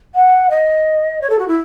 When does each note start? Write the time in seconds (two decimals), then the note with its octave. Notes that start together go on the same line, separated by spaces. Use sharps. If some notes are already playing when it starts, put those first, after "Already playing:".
0.15 F#5
0.50 D#5
1.21 C#5
1.30 A4
1.39 F#4
1.48 E4